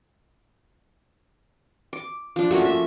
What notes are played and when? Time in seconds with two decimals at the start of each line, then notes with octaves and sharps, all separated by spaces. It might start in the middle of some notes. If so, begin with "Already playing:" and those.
1.93 D6
2.36 F3 D4
2.51 A3 A#3 C#4 F#4
2.64 E5